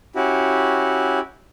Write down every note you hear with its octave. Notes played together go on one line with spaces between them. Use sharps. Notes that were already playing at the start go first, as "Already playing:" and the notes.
C#4 E4 F#4 G4